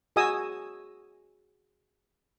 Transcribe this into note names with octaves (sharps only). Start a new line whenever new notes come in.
F#4 G#4 D#5 G#5 D#6 E6